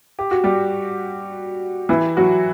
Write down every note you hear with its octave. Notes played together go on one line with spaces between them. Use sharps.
G4
F#4
G3 G4
E3 E4
F#3 F#4